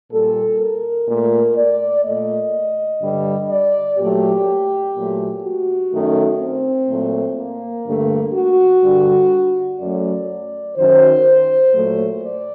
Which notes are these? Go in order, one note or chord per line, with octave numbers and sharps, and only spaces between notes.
A#2 G3 A4
A#4
A#2 A3
D5
A#2 A3 D#5
G2 D3 G3
D5
A#2 F#3 A3 G4
A#2 F#3 A3
F#4
F#2 D#3 A3
C4
A#2 F#3 A3
A#3
G2 D3 A3
F#4
G2 D3 G3
F#2 F#3 A3 D5
F#2 D#3 F#3 C5
A#2 F#3 A3
D5